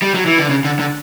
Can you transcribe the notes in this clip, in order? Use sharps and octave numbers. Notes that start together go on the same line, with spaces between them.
G3
F#3
E3
D3
C#3
D3
D3